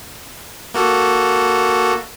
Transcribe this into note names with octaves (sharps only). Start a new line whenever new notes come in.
A#3 F#4 A4